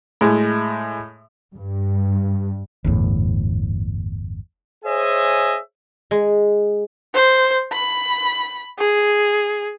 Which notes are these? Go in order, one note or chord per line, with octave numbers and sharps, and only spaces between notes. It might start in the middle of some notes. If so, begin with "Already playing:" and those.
A2 G#3
G2
G1 E2 A2
G#4 C5 C#5 D#5 E5 G#5
G#3
C5
B5
G#4